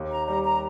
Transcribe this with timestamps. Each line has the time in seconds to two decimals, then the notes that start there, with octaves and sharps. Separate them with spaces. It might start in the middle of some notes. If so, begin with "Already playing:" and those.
Already playing: D#2
0.11 A#5
0.28 G3 A#5
0.45 A#5